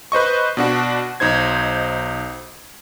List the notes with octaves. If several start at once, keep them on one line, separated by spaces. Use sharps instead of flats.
B4 C5 D#5 C#6
B2 D4 F#4
B1 D#4 C5 G#6